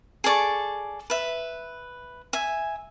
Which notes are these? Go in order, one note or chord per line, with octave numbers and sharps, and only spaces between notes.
G#4 A4 D5 C#6
B4 E5
E5 G#5